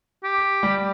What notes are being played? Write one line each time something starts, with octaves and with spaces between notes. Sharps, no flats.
G4
G3